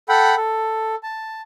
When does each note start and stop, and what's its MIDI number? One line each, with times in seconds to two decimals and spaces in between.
0.09 0.35 69
0.09 0.35 78
0.09 0.35 79
0.09 0.35 83
0.36 0.95 69
1.03 1.41 81